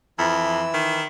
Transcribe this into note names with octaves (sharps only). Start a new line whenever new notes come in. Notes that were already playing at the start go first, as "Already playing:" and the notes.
F2 E3 E4 E6
D#3